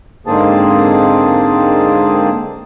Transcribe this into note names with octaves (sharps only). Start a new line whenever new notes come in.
G#2 D3 A#3 C4 G#4 A5